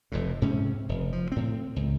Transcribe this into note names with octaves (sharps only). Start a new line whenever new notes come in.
F1 F2 A2
G#2 C3 C4 C#4
F1
F3
A2 C4
C#2